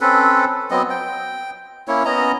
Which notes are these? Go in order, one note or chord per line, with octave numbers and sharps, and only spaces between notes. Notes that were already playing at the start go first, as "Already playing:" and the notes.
C4 C#4 A4 B4
F#3 B3 C4 D#5
G5
A#3 C#4 E4 C#5
B3 C#4 D#5 A#5